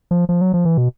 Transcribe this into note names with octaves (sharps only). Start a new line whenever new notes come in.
F3
F3
F#3
F3
E3
B2